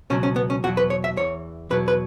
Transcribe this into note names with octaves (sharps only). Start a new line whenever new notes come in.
C#2 B2 F#3 C#4
C#4
B3
C#4
E2 B2 F#3 F#4
B4
C#5
E5
E2 E3 C#5
E2 B2 F#3 B4
B4